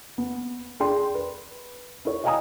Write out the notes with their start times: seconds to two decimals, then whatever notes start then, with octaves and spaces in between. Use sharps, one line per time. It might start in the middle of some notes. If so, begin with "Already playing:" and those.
0.18 B3
0.80 D4 G#4 G5 C6
1.15 B4
2.05 E4 C#5
2.24 D#5 F5 G5 G#5 A#5 D#6